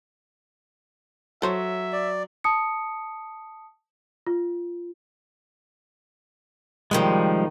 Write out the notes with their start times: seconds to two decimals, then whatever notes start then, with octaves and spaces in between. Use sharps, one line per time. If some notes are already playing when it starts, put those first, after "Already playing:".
1.42 F#3 A4 C5 C#5 E5
1.92 D5
2.44 A5 D#6 C#7
4.27 F4
6.91 D#2 C3 D#3 F3 G3 G#3